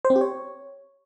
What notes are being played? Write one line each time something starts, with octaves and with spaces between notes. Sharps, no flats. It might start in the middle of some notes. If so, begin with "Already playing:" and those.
C5
C4
G4
C#5